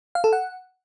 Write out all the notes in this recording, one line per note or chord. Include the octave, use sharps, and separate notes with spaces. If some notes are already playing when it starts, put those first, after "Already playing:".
F5
A4
F#5